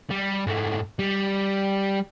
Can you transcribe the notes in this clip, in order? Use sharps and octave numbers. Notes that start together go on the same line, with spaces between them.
G3
G#2 A3
G3